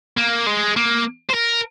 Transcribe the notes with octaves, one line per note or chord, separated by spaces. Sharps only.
A#3
G#3
A#3
C5
A#4